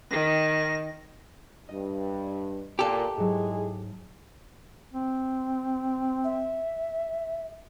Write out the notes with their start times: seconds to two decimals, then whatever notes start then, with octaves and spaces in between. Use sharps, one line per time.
0.11 D#3 A#6
1.69 G2 D#5
2.79 A#2 G4 A4 E5 G#5 E6
3.17 G#2 F#3 G#3 E4 G#4
4.93 C4
6.24 E5